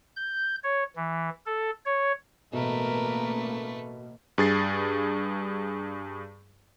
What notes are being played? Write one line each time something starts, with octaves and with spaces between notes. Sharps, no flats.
G6
C#5
E3
A4
C#5
A1 B2 A3 A#3 A#4 B4
G2 G#4 A6 C7